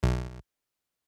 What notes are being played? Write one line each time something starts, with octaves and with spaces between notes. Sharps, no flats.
B1